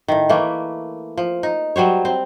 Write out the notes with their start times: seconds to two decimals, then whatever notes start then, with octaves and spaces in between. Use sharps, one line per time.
0.08 A2 D#3
0.29 E3 A3 A#3
1.18 F3
1.43 D#4
1.76 F#3 G3 C5 C#5
2.05 C4